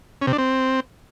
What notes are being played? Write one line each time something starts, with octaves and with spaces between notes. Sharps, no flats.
C#4
C3
D4
C4